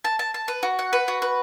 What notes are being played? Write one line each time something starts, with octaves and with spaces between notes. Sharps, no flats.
A5
A5
A5
B4
F#4
F#5
B4
F#4
B4